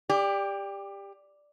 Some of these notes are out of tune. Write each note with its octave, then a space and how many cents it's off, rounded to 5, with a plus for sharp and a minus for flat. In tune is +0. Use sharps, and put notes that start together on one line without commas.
G4 +20 D5 +0